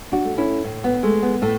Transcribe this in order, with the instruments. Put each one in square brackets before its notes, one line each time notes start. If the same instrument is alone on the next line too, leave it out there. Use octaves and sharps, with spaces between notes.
[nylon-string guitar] D4 F#4
A3
C#4 E4
A2
B3
G#3 A3
B3
A2 A3